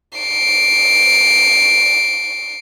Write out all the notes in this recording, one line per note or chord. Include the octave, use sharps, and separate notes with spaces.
C7 D7